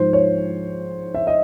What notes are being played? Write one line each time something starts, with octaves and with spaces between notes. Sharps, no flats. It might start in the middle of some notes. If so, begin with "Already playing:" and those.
Already playing: G#2 F3 C5
C#5
E5
D#5